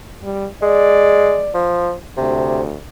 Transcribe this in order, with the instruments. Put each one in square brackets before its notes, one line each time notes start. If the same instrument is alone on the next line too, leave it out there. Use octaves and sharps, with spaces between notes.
[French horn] G3
[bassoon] G#3 [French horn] D5
[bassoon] F3
[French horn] D2 [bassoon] C3